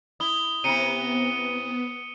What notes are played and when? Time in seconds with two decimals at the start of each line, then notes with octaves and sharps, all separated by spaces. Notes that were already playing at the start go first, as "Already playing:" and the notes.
0.20 E4 D#6 G7
0.64 C3 B3 E4 C#7 D#7